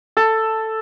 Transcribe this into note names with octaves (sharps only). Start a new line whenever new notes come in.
A4